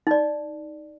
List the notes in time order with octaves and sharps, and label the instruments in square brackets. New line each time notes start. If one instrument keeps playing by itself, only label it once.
[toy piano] D#4 D5